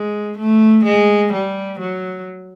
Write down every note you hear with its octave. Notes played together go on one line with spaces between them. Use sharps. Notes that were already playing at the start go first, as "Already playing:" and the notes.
Already playing: G#3
A3
G#3
G3
F#3